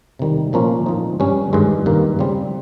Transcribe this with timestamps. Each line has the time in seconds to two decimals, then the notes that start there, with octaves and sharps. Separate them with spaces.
0.19 C3 D#3 G3
0.53 A#2 F3 A#3 C#4 F4
0.86 A#2 F3 C4 D#4
1.20 G2 G3 C#4
1.53 G2 D#3 G#3
1.86 G2 D#3 A#3
2.19 C#3 G3 C4